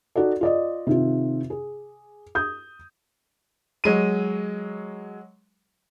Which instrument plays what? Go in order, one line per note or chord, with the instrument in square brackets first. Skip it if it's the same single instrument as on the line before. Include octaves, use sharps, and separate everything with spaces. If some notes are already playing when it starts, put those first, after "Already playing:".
[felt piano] D#4 F#4 A4 D5
F4 D5 D#5
C3 D#3 F4
G#4
D#6 G6
[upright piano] F#3 G#3 D#7